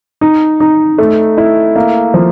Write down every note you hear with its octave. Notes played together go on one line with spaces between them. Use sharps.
D#4
D#4
A3
E4
A#3
F3